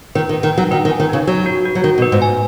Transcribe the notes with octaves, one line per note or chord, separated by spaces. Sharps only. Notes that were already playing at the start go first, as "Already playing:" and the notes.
D#3 B4
D#3
B4
D#3
F#3 D#4
D#3 B4
D#3
G#5
D#3
C#3 D#4
F#3 B4
F#4
F#4
F#3
D#3 F#4
B2
B4
G#2
G#5